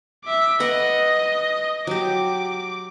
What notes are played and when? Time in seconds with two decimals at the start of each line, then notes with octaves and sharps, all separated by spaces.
0.24 E5 D6
0.60 B4 D#5 F#5 D#6
1.87 F#3 G4 D6